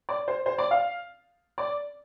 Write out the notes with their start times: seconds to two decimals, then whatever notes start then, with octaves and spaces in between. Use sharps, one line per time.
0.09 D5
0.28 C5
0.46 C5
0.58 D5
0.71 F5
1.58 D5